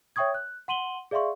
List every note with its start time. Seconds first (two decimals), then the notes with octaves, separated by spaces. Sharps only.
0.16 C#5 E5 G5 C#6 D#6 G#6
0.34 F#6
0.68 F#5 C6 D#7 F#7 G7
1.11 G#4 D5 E5 F5 C6 C#6